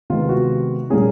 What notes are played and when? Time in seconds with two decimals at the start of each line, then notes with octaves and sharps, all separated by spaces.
0.10 C3 D#3 G#3 B3 F4
0.29 F#4
0.90 A#2 G3 A#3 C#4 G#4